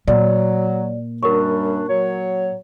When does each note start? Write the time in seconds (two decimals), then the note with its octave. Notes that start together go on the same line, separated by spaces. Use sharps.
0.08 A#2 F#3 D5
1.23 F#2 G3 D4 A#4 C#6
1.89 F#3 C#5